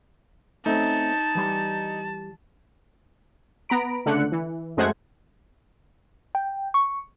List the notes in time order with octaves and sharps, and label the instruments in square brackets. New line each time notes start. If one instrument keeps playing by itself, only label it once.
[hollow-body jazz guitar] A3 C4 C#4 [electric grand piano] D#4 [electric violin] A5
[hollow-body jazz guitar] E3 G3 C6
[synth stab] B3 A#5 B5 D7
C#2 D3 A3 F#6 C#7
E3
F#2 G#3 A3 C5 F#5 G#6
[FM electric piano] G5
C#6